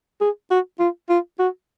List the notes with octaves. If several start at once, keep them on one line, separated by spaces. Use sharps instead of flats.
G#4
F#4
F4
F4
F#4